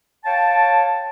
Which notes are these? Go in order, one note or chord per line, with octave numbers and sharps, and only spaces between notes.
C#5 F5 G5 A5